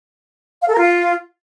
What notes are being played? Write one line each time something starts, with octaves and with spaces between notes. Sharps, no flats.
F5
A4
A#4
F4